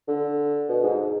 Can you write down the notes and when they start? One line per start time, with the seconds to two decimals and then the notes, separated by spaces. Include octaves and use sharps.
0.08 D3
0.69 B2
0.83 G#2